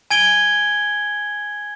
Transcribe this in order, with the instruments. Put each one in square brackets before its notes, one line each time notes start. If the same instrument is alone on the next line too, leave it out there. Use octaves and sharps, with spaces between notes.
[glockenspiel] G#5 G#6 D7 G7